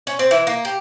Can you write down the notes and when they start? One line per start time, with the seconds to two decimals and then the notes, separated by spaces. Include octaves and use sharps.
0.07 C#4
0.19 C4
0.31 E3
0.47 A#3
0.65 G4